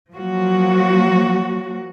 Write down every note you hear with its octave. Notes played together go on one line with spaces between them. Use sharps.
F3 F#3 A#3 F#4